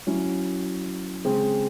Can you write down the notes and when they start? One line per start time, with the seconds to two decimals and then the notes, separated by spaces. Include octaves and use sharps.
0.07 F#3 C#4 E4
1.25 C#3 G#3 C4